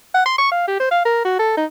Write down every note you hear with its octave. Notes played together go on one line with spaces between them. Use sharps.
F#5
C6
C#6
F5
G4
C5
F5
A#4
F#4
A4
D#4